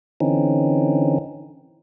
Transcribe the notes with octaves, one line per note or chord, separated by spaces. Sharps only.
D3 E3 C4 C#4 D#4